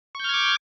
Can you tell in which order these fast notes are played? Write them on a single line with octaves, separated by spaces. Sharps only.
C#6 G6 F6 G#6 D6